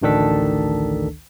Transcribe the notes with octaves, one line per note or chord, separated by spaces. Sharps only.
A1 D2 D#3 D4 A4 B6